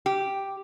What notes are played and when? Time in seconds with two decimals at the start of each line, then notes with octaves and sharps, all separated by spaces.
0.06 G4